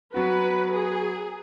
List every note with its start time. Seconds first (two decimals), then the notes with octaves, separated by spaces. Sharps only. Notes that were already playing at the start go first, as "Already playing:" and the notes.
0.14 F#3 B3 F#4 B4
0.73 G#4